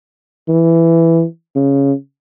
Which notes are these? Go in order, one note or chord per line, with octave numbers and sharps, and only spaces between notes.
E3
C#3